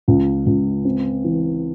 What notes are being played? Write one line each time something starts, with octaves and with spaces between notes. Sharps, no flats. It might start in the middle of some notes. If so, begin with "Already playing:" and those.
C#2
C#2
C4
E3